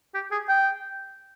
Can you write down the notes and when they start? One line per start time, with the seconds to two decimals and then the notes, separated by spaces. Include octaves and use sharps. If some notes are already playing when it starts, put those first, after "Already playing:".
0.14 G4
0.31 G#4
0.49 G5